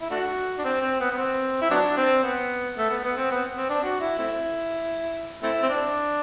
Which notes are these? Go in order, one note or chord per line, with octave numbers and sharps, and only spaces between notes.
E4
A3 D4 F#4
D4
C4
C4
B3
B3
C4
E4
F#3 B3 D4
C4
B3
A3
B3
B3
C4
B3
C4
D4
F#4
E4
A3 C4 E4
A3 C4 E4
C4
D4